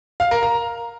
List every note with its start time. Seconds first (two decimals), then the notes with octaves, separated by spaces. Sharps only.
0.20 F5
0.31 A#4
0.43 A#5